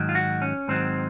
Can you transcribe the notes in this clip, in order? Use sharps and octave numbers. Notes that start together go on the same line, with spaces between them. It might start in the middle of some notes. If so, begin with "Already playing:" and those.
Already playing: G#2 D#3 F#3
F4
F#4
C#4
G#2 D#3 F#3 C4